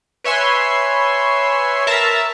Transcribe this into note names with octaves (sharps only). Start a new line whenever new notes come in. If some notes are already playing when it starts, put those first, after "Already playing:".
B4 C#5 E5 G#5 C6
A#4 E5 A5 A#5